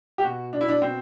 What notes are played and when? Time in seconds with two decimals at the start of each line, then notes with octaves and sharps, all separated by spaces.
0.18 G4
0.24 B2 F#4
0.53 B2 D4
0.61 E4
0.69 D4
0.82 B2 C4